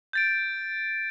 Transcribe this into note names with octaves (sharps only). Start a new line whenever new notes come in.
G6 A6 D7